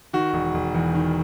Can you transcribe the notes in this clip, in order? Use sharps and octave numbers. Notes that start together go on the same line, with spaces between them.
D#3 F#4
E1
E1
E2
D#3